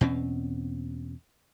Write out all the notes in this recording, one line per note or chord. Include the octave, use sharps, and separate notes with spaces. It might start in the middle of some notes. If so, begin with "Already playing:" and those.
E2 B2 C4 C#4